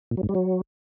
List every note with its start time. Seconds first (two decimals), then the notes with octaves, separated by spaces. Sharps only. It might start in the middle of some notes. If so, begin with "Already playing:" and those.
0.11 A#2
0.17 F#3
0.23 G#2
0.29 G3
0.35 F#3